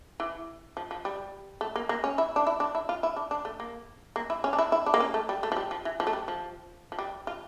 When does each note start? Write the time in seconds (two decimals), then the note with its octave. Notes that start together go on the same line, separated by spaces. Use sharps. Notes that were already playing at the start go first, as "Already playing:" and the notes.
0.20 E3
0.77 F3
0.91 F3
1.05 G3
1.61 A3
1.76 A#3
1.89 A#3
2.04 C#4
2.18 E4
2.36 D4
2.47 E4
2.60 D4
2.75 E4
2.89 F4
3.03 E4
3.16 D4
3.31 D4
3.45 A3
3.60 A#3
4.16 A#3
4.30 E4
4.44 C#4
4.53 D4
4.58 E4
4.72 E4
4.86 D4
4.94 A#3
5.00 C#4
5.14 A3
5.29 G3
5.43 A3
5.52 F3
5.57 G3
5.71 F3
5.85 E3
6.00 F3
6.07 A3
6.13 G3
6.28 F3
6.92 F3
6.99 G3
7.27 F4